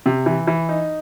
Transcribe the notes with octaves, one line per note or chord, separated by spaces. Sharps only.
C3
E3
E3
D#4